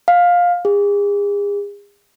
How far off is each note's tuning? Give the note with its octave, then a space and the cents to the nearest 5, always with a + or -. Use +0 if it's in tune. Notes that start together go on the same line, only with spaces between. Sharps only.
F5 +15
G#4 -40